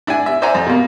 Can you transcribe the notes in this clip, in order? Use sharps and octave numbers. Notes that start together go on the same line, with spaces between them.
D4 E5 F#5 G#5
E5
C5 D5 E5 F#5 G#5 A#5
F2
B2 A#3